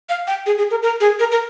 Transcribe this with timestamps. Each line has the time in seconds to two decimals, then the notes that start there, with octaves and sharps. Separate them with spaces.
0.09 F5
0.27 G5
0.46 G#4
0.58 G#4
0.71 A#4
0.83 A#4
1.00 G#4
1.20 A#4
1.32 A#4